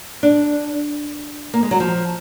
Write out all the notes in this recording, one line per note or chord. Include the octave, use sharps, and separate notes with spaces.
D4
A#3
G#3
F#3
F3